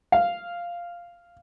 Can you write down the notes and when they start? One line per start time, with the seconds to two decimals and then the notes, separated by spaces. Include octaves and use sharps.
0.12 F5